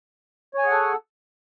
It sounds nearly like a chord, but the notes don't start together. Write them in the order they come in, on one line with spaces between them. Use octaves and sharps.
C#5 G#5 G#4 F#5 A4